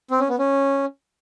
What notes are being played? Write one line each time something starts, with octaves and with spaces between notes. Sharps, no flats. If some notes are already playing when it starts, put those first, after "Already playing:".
C4
C#4
B3
C#4